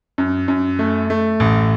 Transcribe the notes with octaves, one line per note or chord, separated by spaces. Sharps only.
F#2
F#2
A3
A3
A1